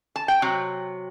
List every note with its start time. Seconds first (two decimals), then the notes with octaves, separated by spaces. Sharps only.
0.16 A5
0.28 G5
0.42 C3 F#3